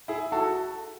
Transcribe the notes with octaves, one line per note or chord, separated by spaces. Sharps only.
E4 G#4
F#4 A4